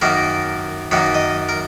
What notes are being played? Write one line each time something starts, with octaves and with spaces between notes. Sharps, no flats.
F#2 D#3 A#3 C#4 A#4
F#2 D#3 A#3 C#4 C#5
D#5
A#4